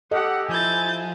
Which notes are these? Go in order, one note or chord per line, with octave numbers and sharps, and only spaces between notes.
G4 A4 D#5 F#5
F3 E4 G#5 G6 A6